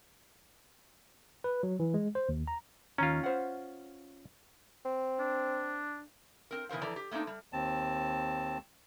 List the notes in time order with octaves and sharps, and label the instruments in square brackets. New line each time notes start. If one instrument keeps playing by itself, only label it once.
[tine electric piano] B4
F#3
E3
G#3
C5
D#2
A#5
[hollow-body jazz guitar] D#2 D#3 A#5 [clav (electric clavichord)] C#4 F4
[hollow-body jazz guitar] C5 F#5
[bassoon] C4
[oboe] D4
[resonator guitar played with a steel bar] C4 A#4
B2 E3 A#4 C5 F5
F2 E3 A4 D5 A#5
G4
A3 A#3 C4 D4 D#4
G3
[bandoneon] D#2 C4 A5